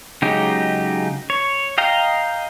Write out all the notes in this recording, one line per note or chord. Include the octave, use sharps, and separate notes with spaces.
C#3 F#3 G#3 D#4 G4
C#5
D#5 F5 G5 A#5